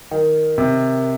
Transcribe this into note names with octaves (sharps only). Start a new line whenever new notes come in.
D#3
C3